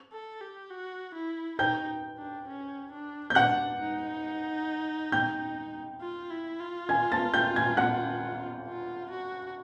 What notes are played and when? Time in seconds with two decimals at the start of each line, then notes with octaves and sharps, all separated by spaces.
0.12 A4
0.41 G4
0.70 F#4
1.15 E4
1.59 D#4 G5 G6
2.18 D4
2.48 C#4
2.92 D4
3.30 G6
3.35 D4 F#5 F#6
3.80 D#4
5.12 G5 G6
6.01 F4
6.30 E4
6.60 F4
6.89 G#5 G#6
7.12 A5 A6
7.34 G5 G6
7.56 G#5 G#6
7.77 F#5 F#6
8.66 F4
9.10 F#4